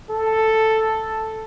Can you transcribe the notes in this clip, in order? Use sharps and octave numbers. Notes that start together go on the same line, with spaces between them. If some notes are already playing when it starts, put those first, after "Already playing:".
A4